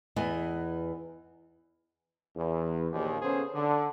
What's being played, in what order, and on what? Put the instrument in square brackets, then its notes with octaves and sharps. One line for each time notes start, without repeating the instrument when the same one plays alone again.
[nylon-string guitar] E2 E3 B3 D#5
[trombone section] E2
A#1 D#2
C#3 B3 C#4 G#4 A4 C5
D3